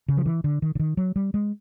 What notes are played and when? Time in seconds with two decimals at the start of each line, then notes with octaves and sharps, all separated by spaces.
0.08 C#3
0.17 F3
0.26 E3
0.44 D3
0.62 D#3
0.75 D3
0.79 D#3
0.97 F#3
1.16 G3
1.34 G#3